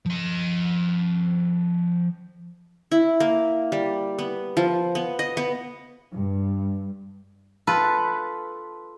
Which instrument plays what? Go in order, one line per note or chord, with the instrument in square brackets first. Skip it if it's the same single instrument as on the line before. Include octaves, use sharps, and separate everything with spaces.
[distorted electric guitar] F3 D#5
[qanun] E4
A#3
G3
B3
F3
B3
D#5
B3
[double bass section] G2
[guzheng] F4 A4 B4